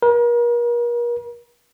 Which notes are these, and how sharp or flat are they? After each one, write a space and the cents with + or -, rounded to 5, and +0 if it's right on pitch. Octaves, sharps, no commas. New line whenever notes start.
A#4 +40